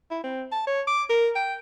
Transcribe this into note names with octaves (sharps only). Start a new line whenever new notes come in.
E4
C4
A5
C#5
D6
A#4
G5